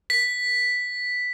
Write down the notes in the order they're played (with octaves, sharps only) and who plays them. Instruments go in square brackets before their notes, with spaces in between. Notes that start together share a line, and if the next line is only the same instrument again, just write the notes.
[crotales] B6